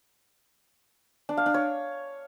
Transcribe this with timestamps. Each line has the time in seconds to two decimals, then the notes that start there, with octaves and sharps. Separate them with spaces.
1.29 D4
1.37 F5
1.46 D4
1.54 C#5